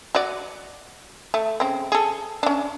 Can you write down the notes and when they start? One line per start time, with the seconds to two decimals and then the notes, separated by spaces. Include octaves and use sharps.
0.15 F#4 D5
1.34 A3
1.60 C#3 C4
1.92 G#4 A4
2.43 C#4 D4